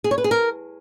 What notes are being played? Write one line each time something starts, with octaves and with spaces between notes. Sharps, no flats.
G#4
C#5
B4
G#4
A#4